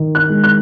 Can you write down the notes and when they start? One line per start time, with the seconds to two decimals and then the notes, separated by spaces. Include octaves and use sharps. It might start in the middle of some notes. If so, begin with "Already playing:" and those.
Already playing: D#3
0.15 F#6
0.29 G#3
0.44 F#6